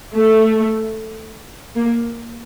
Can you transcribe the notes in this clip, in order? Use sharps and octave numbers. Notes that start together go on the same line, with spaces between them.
A3
A#3